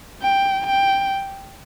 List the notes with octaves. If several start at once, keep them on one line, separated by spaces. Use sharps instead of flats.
G5
G5